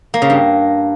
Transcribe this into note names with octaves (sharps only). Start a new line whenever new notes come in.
A#3
C#3
G2